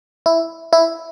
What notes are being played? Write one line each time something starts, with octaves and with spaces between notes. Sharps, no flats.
E4
E4